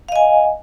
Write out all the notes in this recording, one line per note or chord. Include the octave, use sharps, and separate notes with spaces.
D#5 F5 G#5